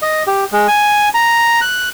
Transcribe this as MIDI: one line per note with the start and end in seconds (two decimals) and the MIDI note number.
0.02 0.23 75
0.27 0.45 67
0.52 0.67 56
0.68 1.09 80
1.14 1.60 82
1.61 1.89 90